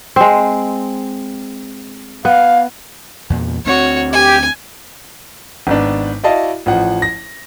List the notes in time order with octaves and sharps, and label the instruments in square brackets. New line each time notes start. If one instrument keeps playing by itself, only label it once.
[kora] G#3 C4
[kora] B3 [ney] F5
[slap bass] E2 A#2
[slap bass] D2 A#3 C4 [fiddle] F#4 C#5
[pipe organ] G4 [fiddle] G#5
[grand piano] G#1 B3 D4
E4 F#4 D5 D#5 F5 A5
A1 F3 F#5
A#6